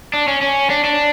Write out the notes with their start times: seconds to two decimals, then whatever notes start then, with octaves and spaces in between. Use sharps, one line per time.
0.13 D4
0.28 C#4
0.41 C#4
0.70 D4
0.84 D4